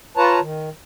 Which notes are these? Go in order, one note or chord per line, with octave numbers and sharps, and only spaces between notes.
F4 B4 C#5 A5 A#5
D#3